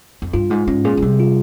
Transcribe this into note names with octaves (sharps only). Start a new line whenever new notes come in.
F2
G2 F4
G#2 G#3
G#2 C#4
A#2 G#4
A#2
C3 G3
F4